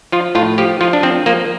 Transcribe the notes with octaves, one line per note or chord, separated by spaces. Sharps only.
F3 F4
A2 F4
F3 G4
F3 F4
D4
F3 C4
F3 A#3